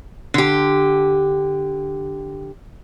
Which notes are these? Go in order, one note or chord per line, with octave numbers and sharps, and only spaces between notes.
D3 G4